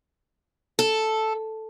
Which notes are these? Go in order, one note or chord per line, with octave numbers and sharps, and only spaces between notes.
A4